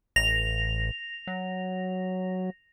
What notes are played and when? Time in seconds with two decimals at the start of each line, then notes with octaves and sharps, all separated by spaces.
0.16 A1 A#6 F7
1.27 F#3